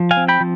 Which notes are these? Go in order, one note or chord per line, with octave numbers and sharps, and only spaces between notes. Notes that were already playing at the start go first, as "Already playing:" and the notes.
Already playing: F3
F5 G#5
C4
G5 B5
F3